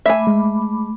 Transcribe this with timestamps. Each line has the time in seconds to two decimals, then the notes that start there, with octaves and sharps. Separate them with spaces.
0.06 A3 E5 G#5 B5 D6
0.27 G#3